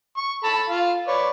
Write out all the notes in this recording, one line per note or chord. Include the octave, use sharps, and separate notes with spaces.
C#6
A4 A5 B5
F4 F5
B4 C#5 D5